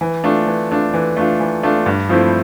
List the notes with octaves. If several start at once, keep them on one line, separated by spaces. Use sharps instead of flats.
E3
A3 D4 F4
E3
A3 D4 F4
E3
A3 D4 F4
E3
A3 D4 F4
G2
F3 A3 C4 E4